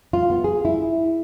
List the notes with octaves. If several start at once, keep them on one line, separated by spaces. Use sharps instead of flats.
F4
B3
G#4
E4